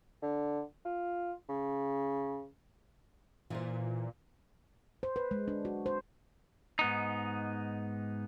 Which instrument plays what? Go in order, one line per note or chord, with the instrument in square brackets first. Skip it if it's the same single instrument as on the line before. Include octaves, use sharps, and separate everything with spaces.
[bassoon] D3
F4
C#3
[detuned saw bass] A#2 [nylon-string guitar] E3 F4 C5
[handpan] C5
B4
G#3
D4
F#4
C5
[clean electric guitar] G#2 B3 D#4